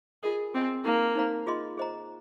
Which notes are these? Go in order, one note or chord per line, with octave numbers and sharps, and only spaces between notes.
F4 G#4 A#4 D#5
C4 G#4 D#5 G#5
A#3 D#4 A#4 F5
D#4 C5 F5 A#5
F4 G#4 D#5 C6
G#4 C5 D#5 A#5